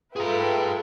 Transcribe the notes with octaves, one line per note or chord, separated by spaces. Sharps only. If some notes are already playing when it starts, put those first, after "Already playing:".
F4 G#4 A4 B4 E5 G5 A#5